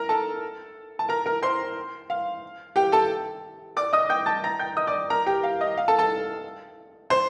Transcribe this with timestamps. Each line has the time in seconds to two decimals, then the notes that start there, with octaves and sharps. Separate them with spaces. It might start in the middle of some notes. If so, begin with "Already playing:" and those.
Already playing: A#4 A#5
0.09 A4 A5
0.99 A5
1.09 A#4 A#5
1.26 A#4 A#5
1.42 C5 C6
2.10 F5
2.76 G4 G5
2.92 A4 A5
3.77 D5 D6
3.93 D#5 D#6
4.10 G5 G6
4.26 A5 A6
4.44 A#5 A#6
4.59 G5 G6
4.77 D#5 D#6
4.87 D5 D6
5.10 A#4 A#5
5.26 G4 G5
5.43 F5
5.61 D#5
5.77 F5
5.88 A4 A5
5.99 A4 A5
7.10 C5 C6